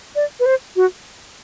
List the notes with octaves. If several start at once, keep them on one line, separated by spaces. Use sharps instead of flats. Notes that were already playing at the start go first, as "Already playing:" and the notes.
D5
B4
C5
F#4